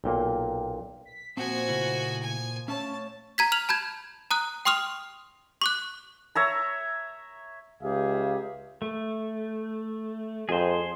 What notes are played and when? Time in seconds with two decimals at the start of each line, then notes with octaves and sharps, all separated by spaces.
0.04 B1 A#2 A#3 G5
1.05 B6
1.37 A#2 F3 C4 F#4 G#5
1.68 C#3 A3 E4
2.23 G#5
2.68 A3 C#4 C#5 A5
3.38 A#5 G#6 B6
3.52 F6 F7 F#7
3.69 A5 B5 G6 G#6
4.31 A#5 D#6 F#6
4.65 G5 C6 C#6 D#6 F6 F7
5.61 C#6 D6 F#6
6.35 C#5 E5 A#5
7.83 C#2 G4 G#4 E5 F5
8.82 A3
10.49 F2 G#4 C5